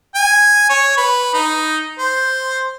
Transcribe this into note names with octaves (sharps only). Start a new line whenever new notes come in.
G#5
C#5
B4
D#4
C5